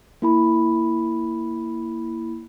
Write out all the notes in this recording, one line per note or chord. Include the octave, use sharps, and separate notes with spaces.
A#3 E4 B5